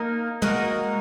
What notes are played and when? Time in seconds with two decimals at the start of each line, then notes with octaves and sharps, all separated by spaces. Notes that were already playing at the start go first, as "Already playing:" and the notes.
Already playing: A#3 D#4 A#4
0.42 G#3 A#3 D#4 F#4 A#4